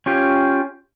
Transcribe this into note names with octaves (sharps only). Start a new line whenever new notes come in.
C#4 F4 G4